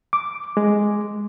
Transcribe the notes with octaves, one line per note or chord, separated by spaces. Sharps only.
D6
G#3